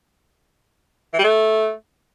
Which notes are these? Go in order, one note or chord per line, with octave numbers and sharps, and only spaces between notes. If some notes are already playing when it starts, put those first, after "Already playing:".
E3
G3
A3